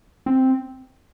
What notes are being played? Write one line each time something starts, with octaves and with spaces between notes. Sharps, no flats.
C4